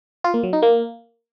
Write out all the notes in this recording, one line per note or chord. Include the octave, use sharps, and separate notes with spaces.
F4
A#3
F#3
D#4
A#3